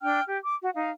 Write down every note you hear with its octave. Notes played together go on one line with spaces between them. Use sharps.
D4 G5 F6
G4
D6
F#4
D#4 F5